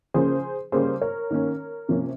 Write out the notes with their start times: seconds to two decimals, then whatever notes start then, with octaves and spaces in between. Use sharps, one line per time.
0.14 C#3 F3 A#3 C#4 G#4 C5
0.72 C#3 G3 A#3 C#4 G#4 C5
1.01 A#4 C#5
1.31 D#3 A#3 C#4
1.89 C3 F3 A#3 C#4